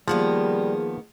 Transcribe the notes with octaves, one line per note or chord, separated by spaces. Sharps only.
D#3 F3 G3 A#3 B3 G#4 F#5